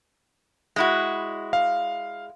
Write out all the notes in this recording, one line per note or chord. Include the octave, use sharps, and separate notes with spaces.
G#3 E4 F#4
F5